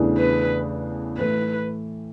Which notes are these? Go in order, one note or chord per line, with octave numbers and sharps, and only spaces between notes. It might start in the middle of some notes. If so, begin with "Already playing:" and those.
Already playing: E2 C#3 E3 A3 D4
B4
A2 E3 A3 B4